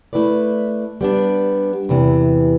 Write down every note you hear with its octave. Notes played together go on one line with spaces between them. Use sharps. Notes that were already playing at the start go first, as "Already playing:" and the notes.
A3 E4 B4 D5
G3 B3 D4
E2 C3 E3